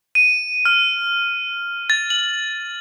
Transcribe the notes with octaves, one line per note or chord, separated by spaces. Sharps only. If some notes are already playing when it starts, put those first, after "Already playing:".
D#7
F6
A6
F#7